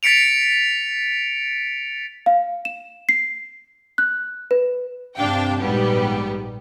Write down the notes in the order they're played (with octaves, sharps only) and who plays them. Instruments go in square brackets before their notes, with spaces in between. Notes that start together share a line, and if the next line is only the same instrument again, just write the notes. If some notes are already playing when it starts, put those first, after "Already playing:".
[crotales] A6 B6 C#7 D7 F7
[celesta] F5
E7
C7
F#6
B4
[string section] G2 C3 D4 F5 G5
A#1 G#2 G3 B3 G4